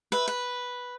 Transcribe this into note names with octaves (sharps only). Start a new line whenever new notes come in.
B4 E5
B4